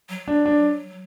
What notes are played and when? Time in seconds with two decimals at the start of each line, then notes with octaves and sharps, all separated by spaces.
0.09 F#3
0.28 D4
0.46 D4